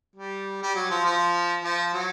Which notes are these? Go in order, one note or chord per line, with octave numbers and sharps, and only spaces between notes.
G3
G3
F#3
F3
F3
F3
F#3